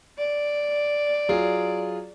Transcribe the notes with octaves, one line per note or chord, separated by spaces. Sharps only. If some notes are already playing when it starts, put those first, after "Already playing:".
D5
F#3 F4 G#4